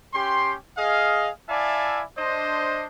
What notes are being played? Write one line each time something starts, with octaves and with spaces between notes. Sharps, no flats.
C#4 G4 G5 C6
G#4 D#5 F5
E4 D5 E5 F5 G#5 A5
D4 C5 D#5